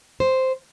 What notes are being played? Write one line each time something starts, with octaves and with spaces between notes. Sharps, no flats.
C5